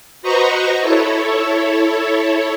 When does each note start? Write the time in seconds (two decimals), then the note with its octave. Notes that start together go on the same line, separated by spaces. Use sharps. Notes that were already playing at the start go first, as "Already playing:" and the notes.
0.22 F#4 B4 C5 D#5 A#5 C#6
0.80 E4 A4 C#5